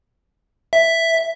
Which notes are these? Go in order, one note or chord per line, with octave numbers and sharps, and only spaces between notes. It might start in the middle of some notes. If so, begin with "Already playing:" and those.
E5